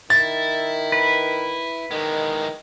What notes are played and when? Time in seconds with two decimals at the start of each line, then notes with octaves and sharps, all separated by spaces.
0.10 D#3 E4 A6
0.92 B4
1.91 D#3 E3 G#3